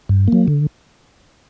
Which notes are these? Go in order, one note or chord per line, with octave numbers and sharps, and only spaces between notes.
G2
F#3 A#3
D3